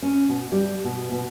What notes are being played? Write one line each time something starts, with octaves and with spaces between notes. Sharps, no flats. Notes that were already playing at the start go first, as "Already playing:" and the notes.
C#4
B2
G3
B2
B2